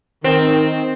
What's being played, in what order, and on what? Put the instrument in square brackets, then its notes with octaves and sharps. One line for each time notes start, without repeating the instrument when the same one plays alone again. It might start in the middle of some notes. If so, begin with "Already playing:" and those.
[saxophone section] D#3 [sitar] C4